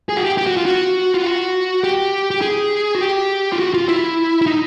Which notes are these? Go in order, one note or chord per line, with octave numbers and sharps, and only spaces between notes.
G#4
F#4
G4
G4
F#4
F4
F#4
F4
F#4
G4
G4
G#4
F#4
G4
F4
F#4
F4
E4
E4
D#4